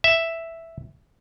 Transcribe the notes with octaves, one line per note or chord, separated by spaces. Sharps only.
E5